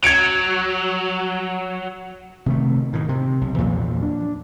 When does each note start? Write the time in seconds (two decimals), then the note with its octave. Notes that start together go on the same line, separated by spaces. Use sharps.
0.04 F#3 G#6 C#7 D7
2.46 C3 D#3 A3
2.93 A2 D#3
3.09 C3
3.41 B1
3.58 E2 A#2 F3 F#3
4.02 D4